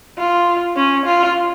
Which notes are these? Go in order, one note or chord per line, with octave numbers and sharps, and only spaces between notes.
F4
C#4
F4